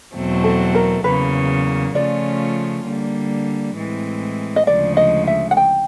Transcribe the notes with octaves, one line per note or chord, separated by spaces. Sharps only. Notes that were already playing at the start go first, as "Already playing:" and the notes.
E2 B2 F#3 A3 C4
A4
A#4
E2 C#3 F#3 A#3 B4
C#3 F3 A3 C#4 F4 D5
D3 G3 A#3
A2 E3 G#3 C4
D#5
D2 C#3 F3 G#3 D5
D#5
E5
F#5
G5